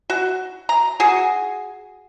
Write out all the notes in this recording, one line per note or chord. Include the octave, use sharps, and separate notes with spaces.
F#4
A#5
F#4 G#4